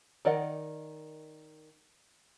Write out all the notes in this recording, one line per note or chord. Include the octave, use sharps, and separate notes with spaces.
D#3 A#4 D5 D#5 F#5